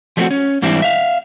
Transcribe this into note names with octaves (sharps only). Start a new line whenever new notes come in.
F3 G3 A3 B3 C4 F#4
C#4
G#2 E3 G3 C4 D4 E4
E5 F5